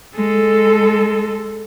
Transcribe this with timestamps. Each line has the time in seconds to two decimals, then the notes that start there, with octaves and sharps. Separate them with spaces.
0.15 G#3 A4